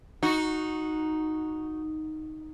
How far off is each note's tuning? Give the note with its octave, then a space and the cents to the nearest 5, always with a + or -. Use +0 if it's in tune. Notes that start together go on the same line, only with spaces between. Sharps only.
D#4 +0 F#4 -10